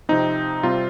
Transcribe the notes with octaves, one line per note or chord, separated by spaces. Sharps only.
C3 F3 C4 D#4
C3 G3 C4 F4